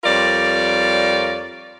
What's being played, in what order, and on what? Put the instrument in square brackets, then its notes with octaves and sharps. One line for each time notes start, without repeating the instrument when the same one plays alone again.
[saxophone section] F2 G3 F4 A#4 C#5 D5